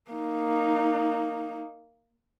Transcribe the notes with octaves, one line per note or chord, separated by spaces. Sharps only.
A#3 D#4